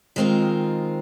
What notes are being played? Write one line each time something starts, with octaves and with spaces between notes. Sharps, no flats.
D#3 G#3 C4 F4 A#4